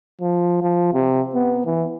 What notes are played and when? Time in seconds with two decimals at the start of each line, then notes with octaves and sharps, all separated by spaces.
0.21 F3
0.63 F3
0.93 C3
1.34 B3
1.66 E3